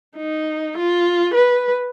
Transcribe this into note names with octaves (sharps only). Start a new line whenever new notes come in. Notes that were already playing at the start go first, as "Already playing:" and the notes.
D#4
F4
B4